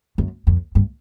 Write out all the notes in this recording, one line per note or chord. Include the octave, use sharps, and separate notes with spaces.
F#2
F2
G2